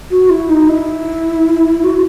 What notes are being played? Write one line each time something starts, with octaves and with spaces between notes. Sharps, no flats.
F#4
E4
D#4
E4
F#4